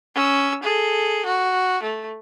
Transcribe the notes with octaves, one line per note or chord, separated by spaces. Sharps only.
C#4 E6
G#4 A4
F#4
A3